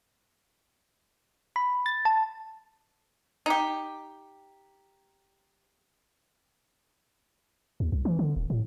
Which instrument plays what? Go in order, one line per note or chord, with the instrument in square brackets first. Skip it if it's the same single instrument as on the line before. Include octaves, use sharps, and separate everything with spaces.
[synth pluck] B5
A6
A5
[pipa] D#4 G4
[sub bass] D#2
C2
E3
D3
D1
A2